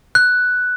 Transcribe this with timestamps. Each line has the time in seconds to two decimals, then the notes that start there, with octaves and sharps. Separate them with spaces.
0.15 F#6